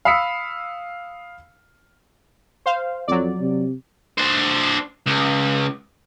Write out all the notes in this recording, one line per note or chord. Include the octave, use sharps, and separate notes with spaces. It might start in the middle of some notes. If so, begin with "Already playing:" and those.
F5 B5 D#6 E6 B6 C#7
C5 F5
F2 F#3 D5
C3
D4 C5
C#2